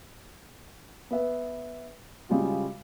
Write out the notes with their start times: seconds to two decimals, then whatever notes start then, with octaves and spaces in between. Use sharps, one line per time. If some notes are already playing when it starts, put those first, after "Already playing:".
1.11 B3 B4 E5
2.29 C#3 G3 G#3 F4 F#4